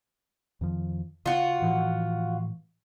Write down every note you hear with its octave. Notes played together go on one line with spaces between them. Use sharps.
F2 D#3 F3
C#3 F4 F#4
A2 E3 F3